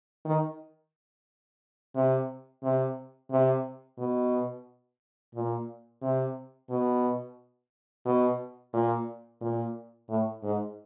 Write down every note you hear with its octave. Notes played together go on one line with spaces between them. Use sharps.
D#3
C3
C3
C3
B2
A#2
C3
B2
B2
A#2
A#2
A2
G#2